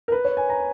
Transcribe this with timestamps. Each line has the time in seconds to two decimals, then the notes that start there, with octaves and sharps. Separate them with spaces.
0.08 A#4
0.12 B4
0.25 C#5
0.37 G#5
0.50 A#5